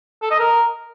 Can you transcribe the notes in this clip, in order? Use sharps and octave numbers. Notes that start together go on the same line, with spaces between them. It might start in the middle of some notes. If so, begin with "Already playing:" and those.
A4
D#5
A#4